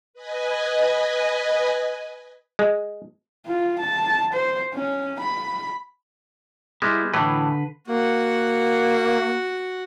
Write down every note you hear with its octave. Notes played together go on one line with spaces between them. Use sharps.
B4 D#5 G#5
G#3
F4
A5
C5
C#4
B5
G3 G#3 B3 E4
A2 D3 E3 B4
A#3 F#4 F#5